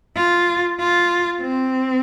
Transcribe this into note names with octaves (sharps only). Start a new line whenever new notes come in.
F4
F4
C4